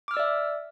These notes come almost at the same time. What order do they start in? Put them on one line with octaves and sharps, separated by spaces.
D6 F6 E6 D5 E5